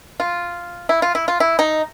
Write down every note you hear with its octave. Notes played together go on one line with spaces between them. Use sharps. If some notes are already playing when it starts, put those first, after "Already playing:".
F4
E4
F4
E4
F4
E4
D#4